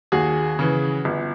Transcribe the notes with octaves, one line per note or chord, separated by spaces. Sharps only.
D#2 F#4 G#4
C#3 E3
G1